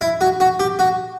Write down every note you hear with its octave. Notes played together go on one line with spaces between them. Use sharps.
E4
F#4
F#4
G4
F#4